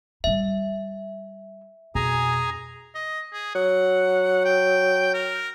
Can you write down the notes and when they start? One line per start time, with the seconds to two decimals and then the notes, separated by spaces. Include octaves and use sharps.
0.24 G3 E4 E5
1.95 F2 B2 G#4 G#5 A#5
2.95 D#5
3.33 G#4
3.55 F#3 F#5
4.45 G5
5.14 A#4